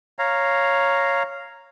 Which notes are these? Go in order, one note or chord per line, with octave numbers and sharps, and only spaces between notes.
C#5 F5 A#5